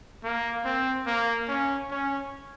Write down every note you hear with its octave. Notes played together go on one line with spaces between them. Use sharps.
A#3
C4
A#3
C#4
C#4